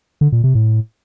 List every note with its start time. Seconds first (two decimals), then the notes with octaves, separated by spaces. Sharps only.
0.21 D3
0.32 A#2
0.44 C3
0.55 A2